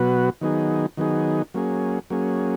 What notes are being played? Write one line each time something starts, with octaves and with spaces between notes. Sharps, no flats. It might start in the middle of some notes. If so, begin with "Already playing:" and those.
Already playing: B2 F#3 B3 F#4 B4
D#3 F#3 B3 D#4 G#4
D#3 F#3 B3 D#4 G#4
F#3 A#3 C#4 G#4
F#3 A#3 C#4 G#4